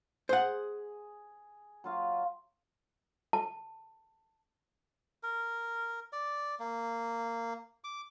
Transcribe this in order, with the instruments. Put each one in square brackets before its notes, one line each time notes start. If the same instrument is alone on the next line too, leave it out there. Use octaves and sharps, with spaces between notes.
[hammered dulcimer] G#4 [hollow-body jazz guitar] C5 F#5
[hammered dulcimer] F#3 F4 F5
[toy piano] A5
[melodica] A#4
D5
A#3
D6